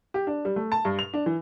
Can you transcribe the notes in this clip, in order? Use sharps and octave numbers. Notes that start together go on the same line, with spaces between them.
G4
D4
G3
A3
A5
G2
F7
D4
E3